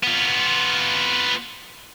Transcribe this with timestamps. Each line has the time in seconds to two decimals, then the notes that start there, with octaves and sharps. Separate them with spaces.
0.03 B3 F4